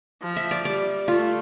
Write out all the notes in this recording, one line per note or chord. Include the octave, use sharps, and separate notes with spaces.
F3
E5
D5
G3 D5
A3 F4